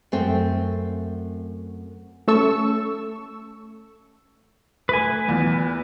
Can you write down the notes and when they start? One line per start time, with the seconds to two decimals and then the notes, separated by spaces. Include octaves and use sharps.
0.12 F#2 A3 C4 G5
2.28 A3 C#4 A4 C#6 E6
4.89 A3 B4 G#5
5.28 E2 A#2